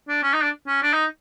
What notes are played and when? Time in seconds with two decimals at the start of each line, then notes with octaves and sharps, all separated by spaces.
0.08 D4
0.23 C#4
0.33 D#4
0.42 D4
0.68 C#4
0.83 D4
0.93 D#4